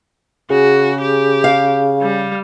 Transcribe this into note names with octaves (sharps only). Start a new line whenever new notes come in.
C#3 F#4 G#4
G4
F5
G3